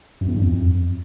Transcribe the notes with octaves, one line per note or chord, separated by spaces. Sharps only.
F#2
E2
G2
F2